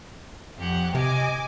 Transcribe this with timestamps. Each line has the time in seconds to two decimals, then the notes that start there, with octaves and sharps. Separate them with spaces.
0.57 F2 G4 F#5
0.95 C3 D#5 G#5 D6